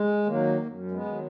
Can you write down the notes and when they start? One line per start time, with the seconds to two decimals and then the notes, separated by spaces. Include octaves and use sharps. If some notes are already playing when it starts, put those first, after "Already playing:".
Already playing: G#3
0.26 D#3 F#3 A#3
0.66 F#2
0.91 G#3 B3
1.05 D#3 F#3